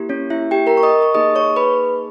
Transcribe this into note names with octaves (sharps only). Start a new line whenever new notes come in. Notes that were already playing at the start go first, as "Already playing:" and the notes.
Already playing: A#3 E4 G4
C#4 C#5
E4 E5
G4 G5
A#4 A#5
C#6
D#5 D#6
C#6
A#3 D#4 G#4 D#5 D#6
C#5 C#6
B4 B5